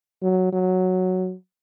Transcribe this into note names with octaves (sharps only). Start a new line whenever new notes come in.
F#3
F#3